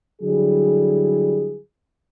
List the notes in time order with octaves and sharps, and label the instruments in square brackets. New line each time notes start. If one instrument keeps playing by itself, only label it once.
[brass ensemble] D3 F#3 G3 E4 G#4